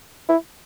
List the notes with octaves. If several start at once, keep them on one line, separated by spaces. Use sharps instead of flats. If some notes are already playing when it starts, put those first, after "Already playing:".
E4